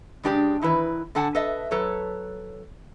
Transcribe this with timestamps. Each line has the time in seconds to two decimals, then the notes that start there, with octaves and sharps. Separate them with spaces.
0.23 C#3 G#3 D4 G4 B4 D5
0.62 D#3 E3 E4 B4
1.15 D3 D4 A4 F#5 G#5 A5
1.35 A4 B4 D#5 E5
1.71 F#3 A4 B4 C#5